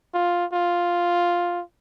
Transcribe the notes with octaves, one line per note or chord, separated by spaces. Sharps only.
F4
F4